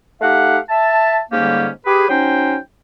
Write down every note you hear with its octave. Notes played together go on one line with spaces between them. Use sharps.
A3 D#4 G4 F5 F#5
E5 A5
G#2 D3 G3 A#3 C#4 G4
G4 G#4 B4
F#3 C#4 D#4 C5 G5